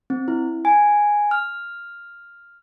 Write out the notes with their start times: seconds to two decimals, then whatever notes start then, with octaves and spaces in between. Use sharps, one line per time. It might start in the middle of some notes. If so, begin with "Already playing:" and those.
0.10 C4
0.28 E4
0.65 G#5
1.31 F6